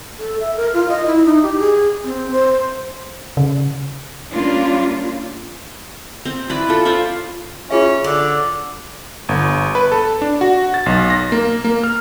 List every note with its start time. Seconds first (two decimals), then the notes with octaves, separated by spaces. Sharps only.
0.19 A4
0.40 E5
0.56 A#4
0.73 F4
0.89 D#5
1.06 E4
1.26 D#4
1.43 G4
1.59 G#4
2.04 C4
2.31 C5
3.37 C#3
4.31 G3 A#3 C#4 D4 F4
6.25 C4
6.50 E4 B4 D5
6.69 F4 A4
6.85 F4 C5 D5 E5
7.71 C#4 F4 G#4 E5
8.04 D3 D5
9.29 G1
9.75 B4
9.92 A4
10.22 D4
10.41 F#4
10.74 A6
10.86 B1
11.10 A#6
11.32 A#3
11.65 A#3
11.84 F6